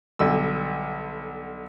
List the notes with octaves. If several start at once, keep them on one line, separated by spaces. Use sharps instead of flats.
B1 D3 G3 E6